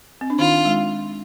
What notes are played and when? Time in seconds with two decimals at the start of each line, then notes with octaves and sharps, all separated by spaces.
0.21 C4
0.30 D4
0.39 D#3 D#4 F4
0.65 G#3